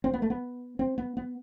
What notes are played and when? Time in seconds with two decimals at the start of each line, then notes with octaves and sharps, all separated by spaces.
0.04 C4
0.14 B3
0.22 A3
0.30 B3
0.79 C4
0.98 B3
1.17 B3